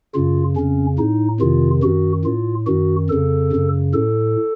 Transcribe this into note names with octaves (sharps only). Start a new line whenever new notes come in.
F#2 C#3 F4
F2 C#3 C#4
A2 D#4
F2 C3 D#3 F4
F#2 D#3 F#4
A2 F4
F#2 D#3 F#4
F2 C#3 A4
F#2 C#3
A2 A4